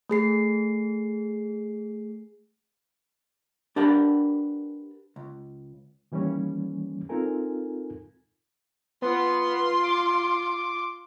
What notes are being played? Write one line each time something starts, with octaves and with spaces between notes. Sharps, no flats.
A3 G#4 C7
D4 G4 A#4 B4 F#5 A5
C#2
D#3 E3 G3 A#3 C#4
C4 D#4 F4 A4 A#4 G#5
B3 F4 C6
D6